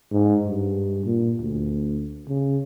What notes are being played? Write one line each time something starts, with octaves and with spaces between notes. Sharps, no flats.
G#2
G2
A#2
D2
C#3